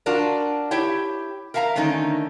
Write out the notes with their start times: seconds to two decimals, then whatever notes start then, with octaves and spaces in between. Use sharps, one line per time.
0.06 D4 F4 F#4 A#4 D5
0.71 E4 G4 C#5 G5
1.54 A#4 E5 F5 G#5 A#5
1.76 D3 D#3 A3 C#4 D#4